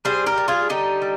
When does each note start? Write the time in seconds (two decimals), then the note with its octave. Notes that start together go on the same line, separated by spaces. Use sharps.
0.05 G3 G#4 C5
0.26 G4 A#4
0.38 G3
0.48 F4 G#4
0.69 D3 D#4 G4
1.02 G3